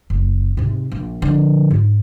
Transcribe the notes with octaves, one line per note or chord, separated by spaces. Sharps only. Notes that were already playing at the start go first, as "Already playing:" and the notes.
F#1
G#2 C3
A#1
D3 F3
G#2